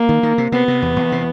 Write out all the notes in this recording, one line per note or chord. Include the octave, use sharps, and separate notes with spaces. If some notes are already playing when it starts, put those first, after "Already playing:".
Already playing: A#3
D#3
D#3
C3
C3 B3
C3
E2
E2
C3